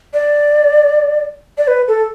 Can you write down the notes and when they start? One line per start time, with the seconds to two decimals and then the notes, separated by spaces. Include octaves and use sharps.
0.14 D5
1.58 D5
1.68 B4
1.88 A4